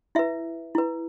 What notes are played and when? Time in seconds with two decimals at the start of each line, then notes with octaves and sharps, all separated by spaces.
0.15 E4 B4 E5
0.75 E4 B4